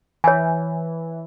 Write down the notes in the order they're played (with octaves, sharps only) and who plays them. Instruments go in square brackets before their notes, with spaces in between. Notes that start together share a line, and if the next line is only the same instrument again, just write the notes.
[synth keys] E3 [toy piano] C#5 G#5